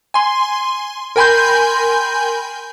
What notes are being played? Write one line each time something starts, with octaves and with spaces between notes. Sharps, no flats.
G#5 C6
A#4 G5 G#5 B5 C6 G6